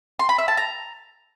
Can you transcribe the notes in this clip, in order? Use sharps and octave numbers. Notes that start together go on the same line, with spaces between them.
C6
B5
E5
A5
A#5